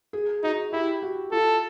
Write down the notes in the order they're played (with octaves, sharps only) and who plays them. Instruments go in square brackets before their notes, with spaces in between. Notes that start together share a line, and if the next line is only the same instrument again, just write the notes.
[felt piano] G#4
[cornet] D#4 [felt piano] F#4
[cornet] E4 [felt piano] G4
[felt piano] F#4
[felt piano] F4 [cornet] A4